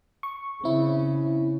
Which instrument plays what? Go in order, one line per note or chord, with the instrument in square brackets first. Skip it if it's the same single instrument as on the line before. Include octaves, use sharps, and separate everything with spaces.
[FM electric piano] C#6
[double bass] C#3 [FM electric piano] C4 E4